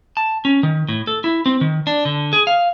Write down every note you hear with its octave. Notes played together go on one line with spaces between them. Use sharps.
A5
C#4
D#3
A2
A4
E4
C4
D#3
D4
D3
G#4
F5